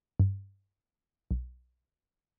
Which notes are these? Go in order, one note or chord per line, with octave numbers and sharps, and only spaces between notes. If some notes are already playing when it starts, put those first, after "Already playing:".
G2
B1